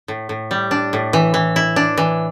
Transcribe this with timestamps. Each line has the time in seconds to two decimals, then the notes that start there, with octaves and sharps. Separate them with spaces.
0.08 A2
0.29 A2
0.51 G3
0.71 D4
0.93 A2
1.13 E3
1.34 E3
1.56 E4
1.76 D4
1.98 E3